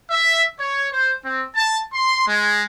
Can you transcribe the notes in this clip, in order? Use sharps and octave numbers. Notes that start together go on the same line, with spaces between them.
E5
C#5
C5
C4
A5
C6
G#3